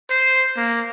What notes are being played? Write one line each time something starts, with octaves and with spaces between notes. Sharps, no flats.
C5
A#3